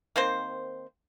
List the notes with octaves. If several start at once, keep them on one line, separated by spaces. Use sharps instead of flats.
D#3 A#3 C4 C5